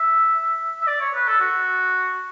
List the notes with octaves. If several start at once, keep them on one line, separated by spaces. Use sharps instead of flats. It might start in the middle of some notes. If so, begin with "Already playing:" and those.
Already playing: E5
E5
D5
C#5
B4
A4
F#4